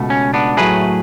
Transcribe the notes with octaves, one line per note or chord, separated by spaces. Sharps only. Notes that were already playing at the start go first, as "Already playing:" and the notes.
Already playing: C#2 B2 A3
C#4
B3 D4
A2 F#3 A3 G#4 B4